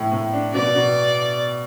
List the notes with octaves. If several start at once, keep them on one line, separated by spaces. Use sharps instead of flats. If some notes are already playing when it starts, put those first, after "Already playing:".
Already playing: A2
A2
D4
B2 D5
B2